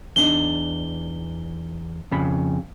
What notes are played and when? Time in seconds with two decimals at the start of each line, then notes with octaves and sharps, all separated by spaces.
0.16 E2 D4 D#4 G7
2.11 F2 C#3 B5